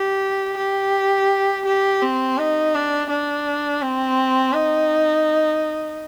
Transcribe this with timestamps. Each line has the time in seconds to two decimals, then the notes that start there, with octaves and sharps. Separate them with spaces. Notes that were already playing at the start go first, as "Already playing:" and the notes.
Already playing: G4
0.58 G4
1.65 G4
2.02 C4
2.38 D#4
2.74 D4
3.10 D4
3.82 C4
4.53 D#4